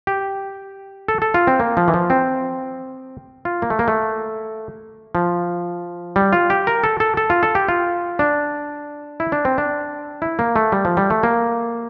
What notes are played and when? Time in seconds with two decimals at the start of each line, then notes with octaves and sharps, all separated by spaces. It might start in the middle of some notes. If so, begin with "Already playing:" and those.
0.07 G4
1.08 A4
1.22 A4
1.34 F4
1.47 C4
1.60 A#3
1.77 F3
1.88 E3
1.94 F3
2.10 C4
3.45 F4
3.62 A#3
3.70 A3
3.79 A#3
3.88 A3
5.15 F3
6.16 G3
6.33 F4
6.50 G4
6.67 A#4
6.83 A4
7.00 A4
7.17 A4
7.30 F4
7.43 A4
7.55 G4
7.68 F4
8.19 D4
9.20 E4
9.32 D4
9.45 C4
9.58 D4
10.22 E4
10.39 A#3
10.56 A3
10.72 G3
10.85 F3
10.97 G3
11.10 A3
11.23 A#3